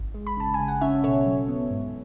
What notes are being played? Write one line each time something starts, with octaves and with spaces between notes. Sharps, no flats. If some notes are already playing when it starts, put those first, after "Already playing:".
Already playing: G#1
G#3
B5
C#3 A5
G#5
C#3
F#5
C#4 C#5 E5
B2 A4 C#5
F#3
B3
G#2